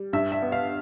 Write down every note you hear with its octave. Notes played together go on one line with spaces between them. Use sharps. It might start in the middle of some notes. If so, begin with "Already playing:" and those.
Already playing: G3
G2 E5
E5
B3
F5